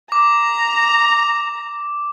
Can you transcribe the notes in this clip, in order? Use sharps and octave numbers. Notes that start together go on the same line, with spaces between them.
A#5 D6